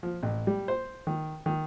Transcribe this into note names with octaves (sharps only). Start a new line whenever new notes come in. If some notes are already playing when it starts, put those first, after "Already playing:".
F3
A1
G3
C5
D#3
D#3